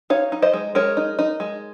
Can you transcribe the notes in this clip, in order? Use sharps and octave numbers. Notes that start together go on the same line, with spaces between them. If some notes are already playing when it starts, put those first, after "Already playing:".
D#4 C#5 F5
D#4
C5 D#5
G#3
G#3 A#4 C#5
D#4
D#4
G#3